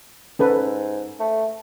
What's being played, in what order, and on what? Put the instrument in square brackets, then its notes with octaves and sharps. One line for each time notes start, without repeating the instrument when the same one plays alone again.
[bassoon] G#2 [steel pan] C#4 A4 B4
[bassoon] A3